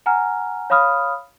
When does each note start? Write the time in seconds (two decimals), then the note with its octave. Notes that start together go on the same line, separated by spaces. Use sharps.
0.06 F#5 G#5 A#5 F6
0.70 C#5 F5 B5 D#6 F6